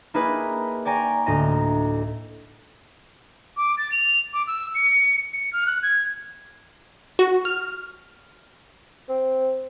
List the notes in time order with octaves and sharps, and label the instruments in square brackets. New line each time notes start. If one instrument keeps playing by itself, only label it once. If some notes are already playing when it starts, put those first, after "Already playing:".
[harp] A#3 D#4 E4 G4 G#4 B4
D5 G5 G#5 A#5 C#6
D2 A2 D#5 A#5
[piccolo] D6
A6
F7
D6
E6
C#7
C#7
F6
F#6
G#6
[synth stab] F#4
F6
[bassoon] C4